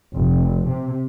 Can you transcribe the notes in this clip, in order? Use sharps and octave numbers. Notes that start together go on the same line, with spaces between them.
F1
C3